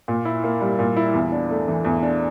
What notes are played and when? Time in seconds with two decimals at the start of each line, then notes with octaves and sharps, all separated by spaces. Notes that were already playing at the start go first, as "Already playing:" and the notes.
0.08 A#2
0.25 E4
0.44 A#3
0.61 G3
0.79 A#2
0.97 E4
1.14 E2
1.32 D4
1.50 A3
1.68 E3
1.85 E2
2.03 D4